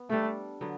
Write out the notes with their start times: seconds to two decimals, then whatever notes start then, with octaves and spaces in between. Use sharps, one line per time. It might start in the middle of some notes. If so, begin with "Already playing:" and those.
Already playing: B3
0.10 G3 A3 D4 A4
0.61 D3 F#3 B3